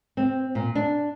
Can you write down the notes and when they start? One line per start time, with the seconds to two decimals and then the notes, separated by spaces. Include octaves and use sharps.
0.17 C4
0.55 A#2
0.75 D4